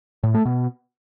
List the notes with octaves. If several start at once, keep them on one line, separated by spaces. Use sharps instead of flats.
A2
A3
B2